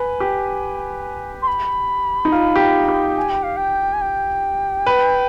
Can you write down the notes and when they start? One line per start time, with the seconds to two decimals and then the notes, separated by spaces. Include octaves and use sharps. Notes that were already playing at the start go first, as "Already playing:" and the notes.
Already playing: B4 G#5
0.20 G4
1.42 C6
1.47 B5
2.25 D#4
2.32 F4
2.56 G4
2.60 F4
2.88 G4
3.17 G#5
3.30 G5
3.43 F5
3.57 G5
3.93 G#5
4.01 G5
4.86 B4